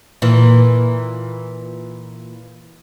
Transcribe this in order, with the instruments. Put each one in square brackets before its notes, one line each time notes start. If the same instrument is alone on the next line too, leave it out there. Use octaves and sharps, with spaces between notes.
[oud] A#2 E3